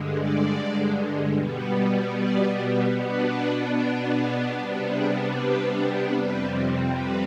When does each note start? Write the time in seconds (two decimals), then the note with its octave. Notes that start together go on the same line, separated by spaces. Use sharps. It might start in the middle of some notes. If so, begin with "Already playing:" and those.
Already playing: G2 D3 G#3
0.14 D5
1.34 B2 G3 B3
2.14 D5
2.93 B2 B3 D4 B4
3.74 D5
4.14 G#4
4.54 C3 G3 B3 D4 G4
4.94 G#4
5.34 B4
6.14 F2 C3 G3 C4 B4
6.94 B4